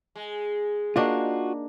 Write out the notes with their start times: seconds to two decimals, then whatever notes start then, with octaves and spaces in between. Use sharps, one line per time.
0.16 G#3
0.96 A#3 D4 D#4 F4 F#4